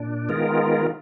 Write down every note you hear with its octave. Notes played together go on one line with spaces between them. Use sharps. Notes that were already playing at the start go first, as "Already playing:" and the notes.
Already playing: A#2 D4
D#3 G#3 B3 F4 A#4